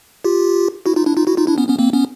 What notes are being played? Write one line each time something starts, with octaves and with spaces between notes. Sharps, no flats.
F4 G4
E4 F#4
D#4 F4
D4 E4
D#4 F4
E4 F#4
D#4 F4
D4 E4
B3 C#4
B3 C#4
A#3 C4
B3 C#4